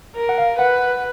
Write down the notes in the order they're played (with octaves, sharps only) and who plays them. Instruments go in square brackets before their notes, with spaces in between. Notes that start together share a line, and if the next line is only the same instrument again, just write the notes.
[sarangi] A#4
[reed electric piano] F#5
F5
[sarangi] B4 [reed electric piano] F#5